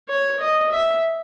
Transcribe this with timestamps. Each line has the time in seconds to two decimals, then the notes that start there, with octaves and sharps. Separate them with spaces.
0.09 C#5
0.40 D#5
0.71 E5